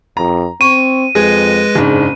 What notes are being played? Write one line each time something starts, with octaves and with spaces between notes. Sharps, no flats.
F2 A#5
C4 C#6 D#7
F2 G#3 G#4 B4 A#6
F#1 G#2 D4